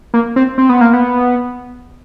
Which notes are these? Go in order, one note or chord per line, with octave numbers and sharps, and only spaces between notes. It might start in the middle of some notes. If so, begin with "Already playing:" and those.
A#3
C4
C4
B3
A#3
B3